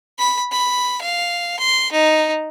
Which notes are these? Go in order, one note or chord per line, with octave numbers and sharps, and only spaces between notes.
B5
B5
F5
C6
D#4